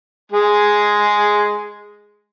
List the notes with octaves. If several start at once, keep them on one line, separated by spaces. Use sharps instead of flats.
G#3 G#4